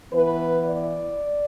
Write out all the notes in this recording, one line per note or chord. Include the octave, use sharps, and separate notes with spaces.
E3 B3 B4
D5